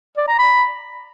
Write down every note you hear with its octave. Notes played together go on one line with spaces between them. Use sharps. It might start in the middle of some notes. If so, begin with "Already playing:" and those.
D5
A#5
B5